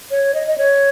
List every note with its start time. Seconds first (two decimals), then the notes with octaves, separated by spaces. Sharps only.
0.11 C#5
0.34 D#5
0.48 D#5
0.58 C#5